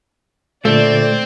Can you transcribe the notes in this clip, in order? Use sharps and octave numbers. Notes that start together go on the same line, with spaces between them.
A#2 D3 A3 C4 D5